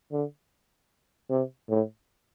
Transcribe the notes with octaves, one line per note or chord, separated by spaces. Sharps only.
D3
C3
A2